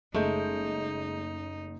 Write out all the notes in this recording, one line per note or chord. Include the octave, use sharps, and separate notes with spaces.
F#1 G#3 A3 D#4 G6